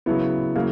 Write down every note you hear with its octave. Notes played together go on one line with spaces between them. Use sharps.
C#3 F#3 B3 E4
C#3 F#3 A#3